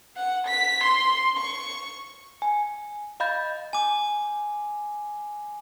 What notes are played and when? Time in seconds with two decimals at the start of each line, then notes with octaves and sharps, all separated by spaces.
0.16 F#5
0.46 B6
0.83 C6
1.37 C#6
2.42 G#5
3.20 D#5 F5 B5 G6 A6
3.73 G#5 D6